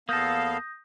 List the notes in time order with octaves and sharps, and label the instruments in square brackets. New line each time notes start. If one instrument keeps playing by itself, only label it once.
[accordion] E2 B3 F5 [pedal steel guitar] A#3 A4 [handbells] D#6 G6 A#6